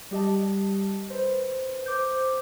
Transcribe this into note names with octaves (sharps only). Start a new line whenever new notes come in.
G3 G4 D#5 A5
B4 C5
C5 D6 G6